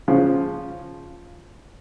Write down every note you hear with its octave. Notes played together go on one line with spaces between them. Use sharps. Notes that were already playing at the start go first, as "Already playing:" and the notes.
C#3 F3